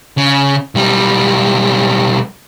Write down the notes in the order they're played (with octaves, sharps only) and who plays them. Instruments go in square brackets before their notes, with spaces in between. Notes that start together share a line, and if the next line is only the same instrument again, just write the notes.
[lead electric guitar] C#3
B1 G3